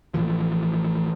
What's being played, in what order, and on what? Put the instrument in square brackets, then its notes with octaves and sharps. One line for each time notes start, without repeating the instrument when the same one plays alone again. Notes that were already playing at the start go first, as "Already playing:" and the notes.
[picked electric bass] A1 A2 E3 F3